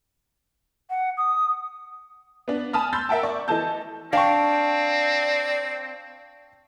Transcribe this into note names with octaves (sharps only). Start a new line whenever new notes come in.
F#5
D#6
B3 D4
G#5 A5 B5 D#6 F6
B5 C6 E6 G6 A6
A#4 E5 F#5 G5 A5
D5 C#6
E3 A4 D#5 A5 G6
C4 D4 D5 F5 G5 C#6